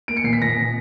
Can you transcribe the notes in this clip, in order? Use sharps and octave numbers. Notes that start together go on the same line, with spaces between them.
A#3 D7
C#7
A#2 C7
B6
A#2 A#6
A#2